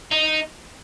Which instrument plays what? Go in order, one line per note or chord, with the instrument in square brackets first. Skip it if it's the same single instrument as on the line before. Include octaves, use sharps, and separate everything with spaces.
[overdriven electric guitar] D#4